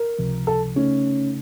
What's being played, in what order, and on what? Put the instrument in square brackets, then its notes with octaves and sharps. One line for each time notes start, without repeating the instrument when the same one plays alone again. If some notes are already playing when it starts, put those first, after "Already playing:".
Already playing: [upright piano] A#4
[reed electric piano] C#2 C3 F3
[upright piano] A4
[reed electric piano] C#3 A3 D#4 [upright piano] C#4